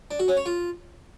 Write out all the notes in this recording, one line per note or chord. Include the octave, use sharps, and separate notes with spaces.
D4
F#4
C#4
C#5
F4